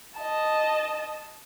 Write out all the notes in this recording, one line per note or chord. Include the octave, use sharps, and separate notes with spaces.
D#5 A5